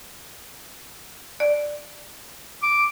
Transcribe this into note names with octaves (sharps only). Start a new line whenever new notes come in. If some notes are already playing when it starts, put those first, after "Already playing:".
D5
D6